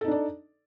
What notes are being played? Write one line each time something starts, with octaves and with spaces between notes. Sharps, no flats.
D4 D#4 A4 D5